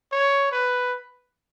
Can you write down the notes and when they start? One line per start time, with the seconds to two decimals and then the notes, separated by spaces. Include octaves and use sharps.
0.12 C#5
0.52 B4